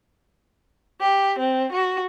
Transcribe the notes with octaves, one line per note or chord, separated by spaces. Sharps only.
G4
C4
F#4